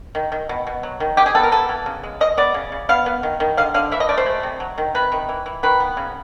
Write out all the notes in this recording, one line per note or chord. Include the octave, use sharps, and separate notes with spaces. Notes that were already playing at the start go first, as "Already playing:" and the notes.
D#3
D#3
B2
B2
F#3
D#3
G#3 G4
G#4
B3 A4
A#4
B3 A4
E3
C#3
G#3
G#3 D#5
B3 D5
C#3
C#3
B3 F5
B3
D#3
D#3
D3 F5
D3 F5
E3 E5
D#5
A3 D5
C5
G#3
C3
F#3
D#3
C3 B4
D#3
E3
E3
D#3 B4
B3
C#3